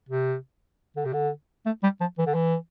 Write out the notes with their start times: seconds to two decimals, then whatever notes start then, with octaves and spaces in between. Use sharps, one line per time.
0.09 C3
0.96 D3
1.05 C3
1.13 D3
1.66 A3
1.83 G3
2.00 F3
2.18 E3
2.26 D3
2.34 E3